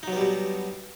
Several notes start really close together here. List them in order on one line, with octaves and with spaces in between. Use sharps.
D#4 F#3 B3 G3 B2